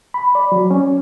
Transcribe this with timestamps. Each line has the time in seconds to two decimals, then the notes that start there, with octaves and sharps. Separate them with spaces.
0.14 B5
0.35 D5
0.52 F#3
0.71 C#4